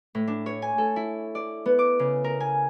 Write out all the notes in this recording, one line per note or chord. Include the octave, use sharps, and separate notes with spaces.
A2
D4
C#5
G#5
A4
E4
D5
B3
D6
C#3
A#4
G#5